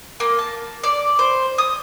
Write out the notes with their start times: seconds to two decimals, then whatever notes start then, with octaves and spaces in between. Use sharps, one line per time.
0.20 A#3
0.39 A5
0.83 D5
1.19 C5
1.58 D#6